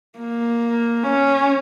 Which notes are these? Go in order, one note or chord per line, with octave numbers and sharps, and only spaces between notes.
A#3
C#4